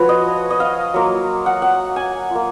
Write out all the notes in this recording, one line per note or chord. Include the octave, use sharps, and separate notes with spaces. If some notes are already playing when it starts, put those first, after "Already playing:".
Already playing: F3 F#4 B4 C#5
D#5
D#5
F5
F#3 A#3 F4
F#5
F#5
G#5
A#3 F4